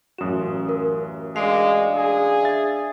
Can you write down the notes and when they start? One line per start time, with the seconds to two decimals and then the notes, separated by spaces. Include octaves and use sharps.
0.18 A1 F#2 F#4 D#6 E7
0.69 A#4
1.36 G#3 D4 D5 F5 C7
1.96 G#4
2.43 E5 A6